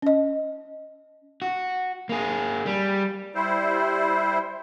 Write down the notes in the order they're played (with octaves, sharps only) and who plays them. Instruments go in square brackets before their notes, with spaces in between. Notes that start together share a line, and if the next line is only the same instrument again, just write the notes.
[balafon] C#4 D#5
[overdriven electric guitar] F#4
A#3 G#4
G3
[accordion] G3 E4 C5